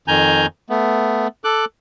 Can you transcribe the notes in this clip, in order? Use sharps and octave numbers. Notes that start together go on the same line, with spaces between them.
F2 D#3 G#5 A#5 G6
A3 B3
A4 D6 F#6